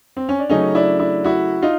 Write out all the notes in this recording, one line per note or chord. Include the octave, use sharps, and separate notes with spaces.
C4
C#4
D4
C#3 F#3 A3 C#4 D#4
D4 E4
D4 E4
E4 F#4
D#4 F4